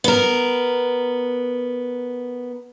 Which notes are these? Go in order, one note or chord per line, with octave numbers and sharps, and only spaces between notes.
B3 A#4